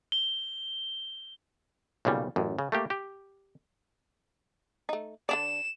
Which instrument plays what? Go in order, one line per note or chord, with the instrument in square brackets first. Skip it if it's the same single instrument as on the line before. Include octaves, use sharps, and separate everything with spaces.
[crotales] G7
[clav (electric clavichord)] B1 A#2 C#3 G3
A1 F#2
C#3
A3 A#3 G4
G4
[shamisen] A3 D#4
[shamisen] D3 D4 D5 [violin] E7